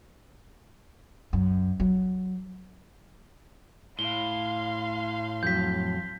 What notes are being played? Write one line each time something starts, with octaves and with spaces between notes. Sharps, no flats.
F#2
F#3
A2 F5 C6 G7
F2 F#3 G6 B6